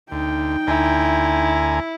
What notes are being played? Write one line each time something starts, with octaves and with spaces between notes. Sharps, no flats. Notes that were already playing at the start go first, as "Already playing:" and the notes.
D2 D#4 G5
D2 E4 G#5 A#5